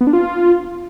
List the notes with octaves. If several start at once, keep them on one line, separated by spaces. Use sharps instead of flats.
B3
D4
F4